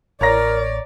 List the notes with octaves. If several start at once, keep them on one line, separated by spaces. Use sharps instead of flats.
A1 A#4 C#5 D5 A#5 A#6